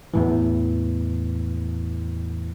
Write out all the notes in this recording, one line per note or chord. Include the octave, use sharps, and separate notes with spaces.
E2 A2 E3